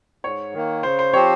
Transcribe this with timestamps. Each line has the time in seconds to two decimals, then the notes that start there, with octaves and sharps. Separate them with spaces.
0.24 G#2 C#5
0.54 D#3 A#3
0.83 C#3 C5
0.99 C5
1.13 F3 C4 G4 C5 C#5